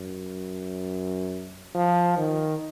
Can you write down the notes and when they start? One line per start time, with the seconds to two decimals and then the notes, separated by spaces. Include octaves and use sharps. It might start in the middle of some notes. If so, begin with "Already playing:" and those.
Already playing: F#2
1.75 F3
2.17 D#3